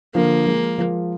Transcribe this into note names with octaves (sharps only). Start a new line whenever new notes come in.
D3 F3 A#3
F3 G#3
F3 G#3